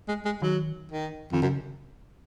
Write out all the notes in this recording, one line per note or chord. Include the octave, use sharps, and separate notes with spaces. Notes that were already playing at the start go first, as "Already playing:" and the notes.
G#3
G#3
D#3 F#3
D#3
F2 D#3
F#2 C#3